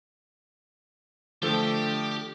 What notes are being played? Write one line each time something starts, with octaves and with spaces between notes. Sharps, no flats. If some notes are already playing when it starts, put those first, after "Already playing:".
D3 F3 A3 G4 A4 G5